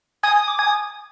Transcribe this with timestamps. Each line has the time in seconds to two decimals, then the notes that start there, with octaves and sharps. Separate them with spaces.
0.23 G#5 D#6
0.47 D6
0.58 G#5 D#6